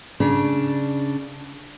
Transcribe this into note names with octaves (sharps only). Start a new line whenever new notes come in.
C#3 D4